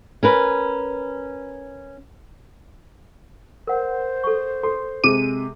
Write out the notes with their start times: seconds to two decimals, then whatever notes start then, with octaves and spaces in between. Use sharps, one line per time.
0.23 C#4 A#4 B4
3.67 A#4 C5 F#5
4.24 A4 C#6
4.63 A4 C6
5.04 C3 G#3 D6 D#7